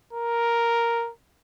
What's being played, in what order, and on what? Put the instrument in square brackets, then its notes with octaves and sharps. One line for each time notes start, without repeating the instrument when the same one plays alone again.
[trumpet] A#4